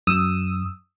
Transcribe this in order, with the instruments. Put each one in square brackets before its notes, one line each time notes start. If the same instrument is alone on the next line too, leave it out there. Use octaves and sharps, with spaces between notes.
[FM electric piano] F#2 D#6 E6